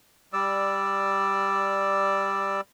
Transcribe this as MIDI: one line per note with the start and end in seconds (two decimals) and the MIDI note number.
0.33 2.61 55
0.33 2.61 74
0.33 2.61 88